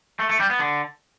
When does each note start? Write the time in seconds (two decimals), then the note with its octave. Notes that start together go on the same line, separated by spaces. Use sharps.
0.19 A3
0.29 A3
0.40 G3
0.50 B3
0.60 D3